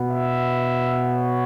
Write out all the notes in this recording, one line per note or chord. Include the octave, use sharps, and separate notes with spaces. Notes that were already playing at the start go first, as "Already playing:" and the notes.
Already playing: B2 B3
E5
C#5